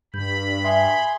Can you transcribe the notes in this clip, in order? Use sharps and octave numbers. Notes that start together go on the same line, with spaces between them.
G2 B5 G6
G#4 E5 C6